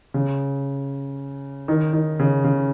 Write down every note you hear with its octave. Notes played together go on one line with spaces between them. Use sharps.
C#3
D#3
D#3
C#3
C#3